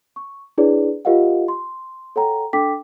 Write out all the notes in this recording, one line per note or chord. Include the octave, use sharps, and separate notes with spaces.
C#6
D4 E4 G#4 B4 C#5 D5
F4 G4 A#4 D#5 F5 F#5
C6
A4 C#5 F#5 G5 A#5
D4 A4 G5 D6 B6